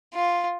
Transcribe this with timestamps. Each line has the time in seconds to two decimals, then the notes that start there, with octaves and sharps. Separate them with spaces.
0.14 F4